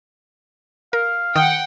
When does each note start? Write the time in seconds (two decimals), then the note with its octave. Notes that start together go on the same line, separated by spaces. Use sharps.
0.93 A#4 F5
1.36 D#3 F#5 G5 D#6 F6